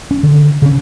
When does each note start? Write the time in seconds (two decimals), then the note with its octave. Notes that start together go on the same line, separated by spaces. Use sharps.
0.11 C#4
0.23 D3
0.62 C#3 C#4